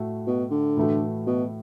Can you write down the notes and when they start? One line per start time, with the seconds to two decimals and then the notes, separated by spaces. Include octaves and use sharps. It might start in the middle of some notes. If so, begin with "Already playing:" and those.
Already playing: A2 A3 F#4
0.27 B2
0.51 D3
0.77 A2 E3 A3 F#4
1.27 B2